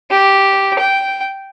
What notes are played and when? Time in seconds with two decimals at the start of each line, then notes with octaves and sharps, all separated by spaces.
0.11 G4
0.79 G5